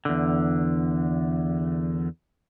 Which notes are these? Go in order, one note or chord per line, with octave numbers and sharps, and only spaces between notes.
E2 D3